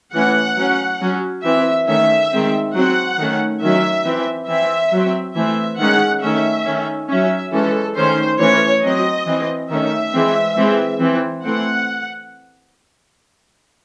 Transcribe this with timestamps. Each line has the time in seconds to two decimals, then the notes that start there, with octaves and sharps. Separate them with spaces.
0.14 E3 A3 C#4 F#5
0.57 F#3 C#4
1.01 F#3 C#4
1.44 E3 C4 E5
1.87 D#3 A3 C#4 E5
2.32 D#3 G#3 C4
2.74 F#3 C4 F#5
3.18 D#3 A3 C#4
3.61 D#3 F#3 C#4 E5
4.05 E3 C4
4.48 E3 C4 E5
4.92 F#3 C4
5.35 E3 A3 C4 E5
5.79 D#3 G#3 C#4 F#5
6.22 D#3 A3 C#4 E5
6.66 D#3 A3 C#4
7.09 F#3 C#4 E5
7.52 E3 G#3 C#4 A4
7.96 D#3 A3 C#4 C5
8.40 E3 A3 C#4 C#5
8.83 F#3 C4 D#5
9.26 E3 C4
9.70 D#3 A3 C#4 E5
10.13 E3 G#3 C4
10.57 E3 G#3 C4
11.00 E3 C4
11.44 E3 A3 C4 F#5